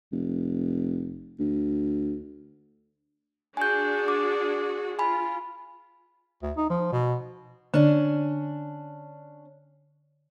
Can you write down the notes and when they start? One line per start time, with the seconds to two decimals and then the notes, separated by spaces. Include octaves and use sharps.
0.12 F1
1.39 D2
3.57 D4 F#4 G#4 G#5 G6
4.08 D6
4.99 F4 G#5 B5
6.43 D2
6.57 D#4
6.70 F3
6.92 B2
7.74 D3 C#4 D4